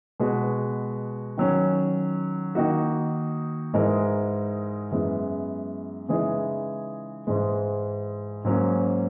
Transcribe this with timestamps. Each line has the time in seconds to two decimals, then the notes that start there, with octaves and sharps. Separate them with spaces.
0.20 B2 G#3 B3 F#4 B4
1.37 D#3 F#3 C#4
2.55 D#3 A#3 D#4 F#4
3.74 G#2 E3 G#3 D#4 A#4
4.91 F#2 E3 G#3 B3
6.08 C#3 E3 G#3 D#4 G#4
7.27 G#2 E3 G#3
8.45 G#2 F#3 A#3 C#4